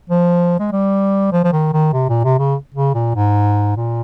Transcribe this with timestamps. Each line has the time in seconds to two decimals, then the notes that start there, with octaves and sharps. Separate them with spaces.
0.10 F3
0.60 G#3
0.72 G3
1.32 F3
1.44 F3
1.52 D#3
1.73 D#3
1.93 C3
2.09 A#2
2.24 C3
2.39 C#3
2.75 C#3
2.94 A#2
3.15 G#2
3.77 A#2